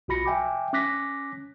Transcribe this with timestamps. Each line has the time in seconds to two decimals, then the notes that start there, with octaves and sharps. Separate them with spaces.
0.08 B1 F4 F#4 B5 A#6 C#7
0.25 E5 G5 G#5 D6
0.73 C#4 D6 F#6 A#6 B6